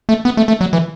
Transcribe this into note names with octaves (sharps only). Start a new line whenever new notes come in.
A3
B3
A3
A3
F#3
E3